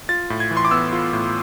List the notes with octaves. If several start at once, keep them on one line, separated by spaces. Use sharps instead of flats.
F4 A6
A2
G#6
E3
C6
D6
B3 E6
F4
A2